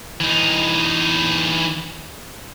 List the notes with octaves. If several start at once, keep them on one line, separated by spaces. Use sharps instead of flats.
E3 D#4